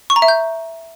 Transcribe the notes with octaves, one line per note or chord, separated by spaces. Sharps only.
C#6
A#5
E5
G6